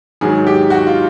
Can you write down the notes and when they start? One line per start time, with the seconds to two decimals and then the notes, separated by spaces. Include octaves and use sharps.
0.21 G#2 D#3 F#3 G#4
0.47 G4
0.70 F#4
0.87 F4